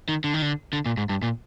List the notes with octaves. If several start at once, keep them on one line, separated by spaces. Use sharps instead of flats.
D#3
D3
D#3
D3
D3
A#2
G#2
G2
A#2